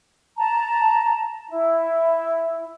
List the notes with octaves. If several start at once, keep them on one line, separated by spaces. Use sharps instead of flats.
A5 A#5
E4